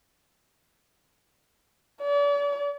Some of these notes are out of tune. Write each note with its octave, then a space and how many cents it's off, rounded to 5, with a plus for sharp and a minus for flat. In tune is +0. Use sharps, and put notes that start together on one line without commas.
D5 -40